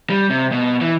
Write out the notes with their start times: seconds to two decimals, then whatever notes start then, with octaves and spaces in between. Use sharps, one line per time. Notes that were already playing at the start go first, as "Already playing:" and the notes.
0.10 G3
0.30 C3
0.52 B2
0.81 E3